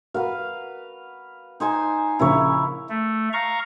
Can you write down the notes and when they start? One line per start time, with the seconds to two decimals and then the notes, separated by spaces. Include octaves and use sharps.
0.14 F#4 A#4 B4 F5 F#5
1.60 D#4 C5 G#5
2.19 A#1 C#3 E4 A#4 C#5 G#5
2.89 A3
3.33 F5 A#5 C#6